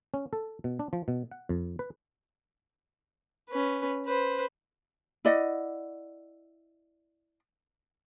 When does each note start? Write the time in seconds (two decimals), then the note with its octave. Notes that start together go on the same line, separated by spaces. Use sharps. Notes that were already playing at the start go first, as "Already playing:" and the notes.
0.14 C#4
0.33 A4
0.64 B2
0.79 D4
0.93 F3
1.08 B2
1.31 F#5
1.49 F2
1.79 B4
3.50 C#4 B4
4.06 B4 C5
5.25 E4 D5 D#5 F#5